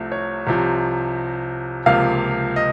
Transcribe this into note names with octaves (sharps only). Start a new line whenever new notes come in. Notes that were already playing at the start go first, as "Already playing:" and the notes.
Already playing: C2 C3 F3 A3
C#5
C2 C3 F3
C#2 C3 F3 A#3 F5
D#5